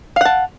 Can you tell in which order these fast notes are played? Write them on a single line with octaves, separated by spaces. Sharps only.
F5 F#5 A5